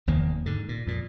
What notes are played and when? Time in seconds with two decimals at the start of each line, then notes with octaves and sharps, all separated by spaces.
0.07 F1 E2 D#3 A#3
0.46 G#2 D3
0.69 A#2
0.87 F2 A#2